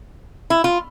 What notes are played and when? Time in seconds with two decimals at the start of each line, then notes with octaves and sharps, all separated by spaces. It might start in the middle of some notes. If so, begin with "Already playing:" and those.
0.50 E4
0.64 F4